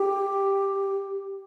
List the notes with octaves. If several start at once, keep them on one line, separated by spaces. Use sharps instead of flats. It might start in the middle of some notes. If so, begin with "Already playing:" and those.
Already playing: G4